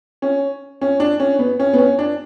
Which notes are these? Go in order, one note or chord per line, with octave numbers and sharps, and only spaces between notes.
C#4
C#4
D4
C#4
B3
C#4
B3
C#4
D4